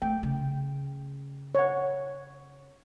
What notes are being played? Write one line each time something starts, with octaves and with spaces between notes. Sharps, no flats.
A3 G5
C#3
C#5 F#5